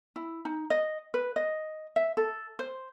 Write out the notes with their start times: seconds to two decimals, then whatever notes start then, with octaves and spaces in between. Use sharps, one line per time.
0.16 E4
0.45 D#4
0.70 D#5
1.14 B4
1.36 D#5
1.96 E5
2.17 A4
2.59 C5